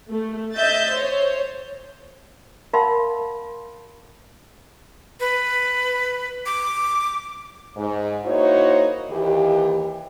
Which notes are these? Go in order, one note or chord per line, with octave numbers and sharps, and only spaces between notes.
A3
D#5 E5 G6 A6
C5 C#5
A#4 F5 F#5 A5 B5 C6
B4
D6
G#2
A#3 D#4 E4 F#4 C5 C#5
D#2 E3 G4